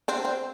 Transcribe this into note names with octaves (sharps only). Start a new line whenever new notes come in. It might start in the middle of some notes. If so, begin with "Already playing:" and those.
C4 D4
C4